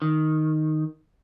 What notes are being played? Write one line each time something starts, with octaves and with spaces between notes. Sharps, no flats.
D#3